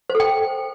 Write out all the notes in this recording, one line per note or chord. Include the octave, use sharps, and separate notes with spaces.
C5
A4
G5